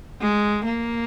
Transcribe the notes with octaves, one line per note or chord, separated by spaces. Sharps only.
G#3
A#3